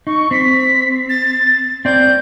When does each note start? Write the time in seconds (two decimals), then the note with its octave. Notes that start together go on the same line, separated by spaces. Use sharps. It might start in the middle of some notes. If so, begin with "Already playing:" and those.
0.07 D#4 C#6
0.31 C4 B6
1.09 A6
1.85 C4 D5 G6